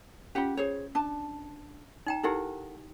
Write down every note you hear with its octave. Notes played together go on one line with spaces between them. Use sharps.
C#4 F4 G4 F#5
G#4 C5 C#5
D4 A5
D#4 G5 A#5
D#4 E4 G4 A4 A#4 F#5